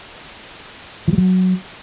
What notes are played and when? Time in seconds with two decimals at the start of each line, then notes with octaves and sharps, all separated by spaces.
1.08 F3
1.13 G3
1.18 F#3